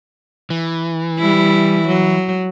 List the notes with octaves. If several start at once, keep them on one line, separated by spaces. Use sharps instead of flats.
E3
G3 E4
F#3